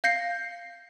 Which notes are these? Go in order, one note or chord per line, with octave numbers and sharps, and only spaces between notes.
F5 G6 A#6 C7 C#7